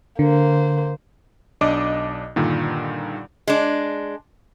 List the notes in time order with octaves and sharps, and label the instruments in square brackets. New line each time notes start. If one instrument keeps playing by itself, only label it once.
[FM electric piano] D3 [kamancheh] A#3 C5
[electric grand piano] B1 D4 D#5 D6
G2 A#2 D3 D#3
[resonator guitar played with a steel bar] G#3 D4